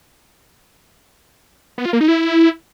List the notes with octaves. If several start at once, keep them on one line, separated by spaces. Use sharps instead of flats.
B3
F4
A#3
D#4
E4